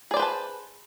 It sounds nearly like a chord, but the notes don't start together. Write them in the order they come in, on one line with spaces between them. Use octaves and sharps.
G#4 D5 C5 B4 A5